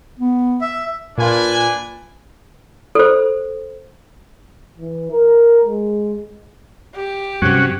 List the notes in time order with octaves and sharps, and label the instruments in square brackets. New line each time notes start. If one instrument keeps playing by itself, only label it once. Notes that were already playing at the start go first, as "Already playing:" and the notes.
[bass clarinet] B3
[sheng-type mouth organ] E5
[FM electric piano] A#2 F4 [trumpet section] D4 B4 G#5
[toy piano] A4 C5
[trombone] E3
A#4
G#3
[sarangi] G4
[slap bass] G2 C3 [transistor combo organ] F#3 C#4 F#4